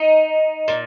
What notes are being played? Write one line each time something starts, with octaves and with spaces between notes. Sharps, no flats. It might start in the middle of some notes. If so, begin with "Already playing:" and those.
Already playing: D#4
A#2